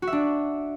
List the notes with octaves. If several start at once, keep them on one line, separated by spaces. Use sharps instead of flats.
F#4
E5
D4